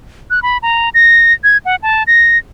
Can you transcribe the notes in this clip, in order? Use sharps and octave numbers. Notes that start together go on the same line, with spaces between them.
F#6
B5
A#5
A#6
G#6
F#5
A5
A#6